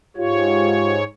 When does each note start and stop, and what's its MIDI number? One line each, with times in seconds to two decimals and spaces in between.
0.17 1.04 44
0.17 0.95 65
0.17 0.95 67
0.17 1.04 73